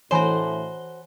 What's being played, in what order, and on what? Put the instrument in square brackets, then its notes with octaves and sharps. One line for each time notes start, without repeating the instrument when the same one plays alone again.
[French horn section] A2 [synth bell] E3 G7 [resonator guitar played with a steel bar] F#4 C5 [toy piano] C#5 G#5 B5